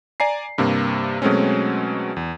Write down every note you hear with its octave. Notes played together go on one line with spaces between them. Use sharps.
D5 G#5 A#5 C7
G2 C3 A#3
B2 F#3 G#3 A3 C4 C#4
E2